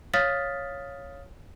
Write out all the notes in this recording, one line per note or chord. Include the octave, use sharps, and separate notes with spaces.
C#5 F5 D#6 F6 A6 B6